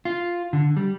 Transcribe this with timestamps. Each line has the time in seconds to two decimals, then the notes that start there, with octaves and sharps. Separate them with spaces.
0.05 F4
0.53 D3
0.77 G3